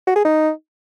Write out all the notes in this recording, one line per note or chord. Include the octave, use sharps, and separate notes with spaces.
F#4
G#4
D#4